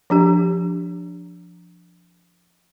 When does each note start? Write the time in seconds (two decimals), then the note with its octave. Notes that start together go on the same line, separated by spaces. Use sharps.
0.10 F3 D4 G4